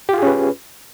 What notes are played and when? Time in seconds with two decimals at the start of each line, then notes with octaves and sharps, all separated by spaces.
0.09 G4
0.13 F4
0.18 G#4
0.23 C#4
0.27 B4